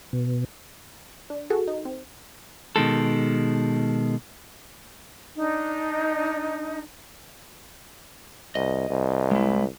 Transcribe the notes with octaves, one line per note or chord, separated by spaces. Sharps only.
B2
D4
F#4 G#4 A4
D#4
C4
B2 D#3 G#3 A4
D4 D#4
C2 D#5
C2
G#3 E4